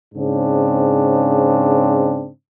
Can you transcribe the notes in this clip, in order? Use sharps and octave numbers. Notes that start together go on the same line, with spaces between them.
G#2 C#3 C4 D4